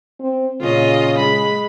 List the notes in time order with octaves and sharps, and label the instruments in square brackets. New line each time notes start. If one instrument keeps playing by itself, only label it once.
[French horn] C4
[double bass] A#2 C#4 [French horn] C#3 [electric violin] F4 D#5
[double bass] G#3 [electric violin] B5